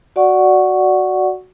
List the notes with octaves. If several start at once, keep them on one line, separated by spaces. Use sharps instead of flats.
F#4 D5 F#5 C#6